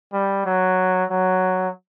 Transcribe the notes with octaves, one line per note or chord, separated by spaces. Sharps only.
G3
F#3
F#3